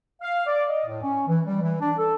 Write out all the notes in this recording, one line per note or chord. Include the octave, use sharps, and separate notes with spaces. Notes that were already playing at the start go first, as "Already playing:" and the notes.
F5
D5
D#5
A2
C#4
E3
G3
E3
D4
A4